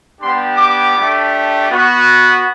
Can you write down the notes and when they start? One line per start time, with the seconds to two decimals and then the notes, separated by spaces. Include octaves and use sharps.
0.21 G3 B3 D4 G4 C6
0.57 D6
0.95 A3 D4 G4
1.69 B3 F#4